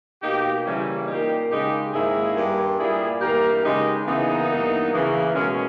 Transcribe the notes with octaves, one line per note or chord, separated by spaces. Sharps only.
B2 A#3 D#4 G4
C#3 E3 G3 A#3 C#4 E4
A#2 A#3 D#4 G4
C#3 G#3 D#4 G4
G#2 D#3 A#3 E4 G#4
G2 G3 A#3
A#2 G3 A#3 E4 G#4
G2 E3 A#3 G4 A#4
C#3 G#3 D#4 G4
C#3 E3 A#3 B3 D#4
G2 E3 A#3
C#3 E3 A#3
B2 G#3 A#3 C#4